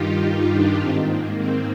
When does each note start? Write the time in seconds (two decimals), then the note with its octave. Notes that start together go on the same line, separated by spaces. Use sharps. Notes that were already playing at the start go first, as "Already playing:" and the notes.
Already playing: G2 D#3 D#4 F4 G4
0.22 D#4
0.51 D4
0.80 G#2 D#3 C4
1.09 A#3
1.38 C4